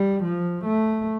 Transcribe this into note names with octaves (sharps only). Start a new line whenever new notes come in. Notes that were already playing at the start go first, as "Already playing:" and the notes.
Already playing: G3
F3
A3